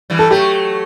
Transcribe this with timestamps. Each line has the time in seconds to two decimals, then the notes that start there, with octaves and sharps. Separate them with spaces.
0.10 E3 G3
0.19 A4
0.30 F#3 A3 G4